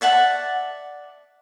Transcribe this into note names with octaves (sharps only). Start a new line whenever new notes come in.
D5 E5 F#5 A5